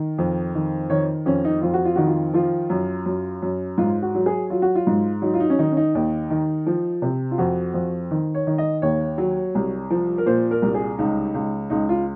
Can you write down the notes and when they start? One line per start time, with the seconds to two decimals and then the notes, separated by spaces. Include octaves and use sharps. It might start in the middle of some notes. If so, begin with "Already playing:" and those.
Already playing: D#3
0.18 F2
0.55 D#3
0.90 D#3 C#5
1.26 F2 C#4
1.45 D#4
1.62 F2 F4
1.74 F#4
1.85 F4
1.96 D#3 F#4
2.07 F4
2.34 F3 F4
2.70 F#2
3.06 F#2
3.42 F#2
3.78 G#2 F4
4.02 F#4
4.15 F#3
4.26 G#4
4.50 F#3 F4
4.62 F#4
4.75 F4
4.87 G#2
5.22 F#3 D#4
5.34 F4
5.40 D#4
5.50 C#4
5.59 D#3 D#4
5.72 C#4
5.77 D#4
5.95 D#2
6.30 D#3
6.66 F3
7.02 C3
7.31 F4
7.38 F2 F#4
7.74 F2
8.11 D#3
8.35 C#5
8.47 D#3
8.58 D#5
8.82 D#2 C#5
9.18 F#3
9.55 C2
9.90 F3
10.18 A#4
10.26 A#2 C5
10.51 A#4
10.62 C2
10.74 G#4
10.98 C#2 D#4
11.34 C#2
11.70 C#2 D#4
11.89 F4